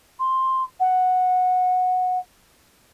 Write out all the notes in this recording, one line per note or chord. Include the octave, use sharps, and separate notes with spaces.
C6
F#5